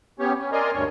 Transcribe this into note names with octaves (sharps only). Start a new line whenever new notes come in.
B3 C#4 G4 C#5
C#4
A#4 D5 D#5 G#5 A#5 C6
D2 G2 C#5